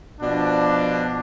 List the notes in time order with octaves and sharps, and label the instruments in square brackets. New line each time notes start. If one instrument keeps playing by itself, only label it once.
[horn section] B2 F3 D4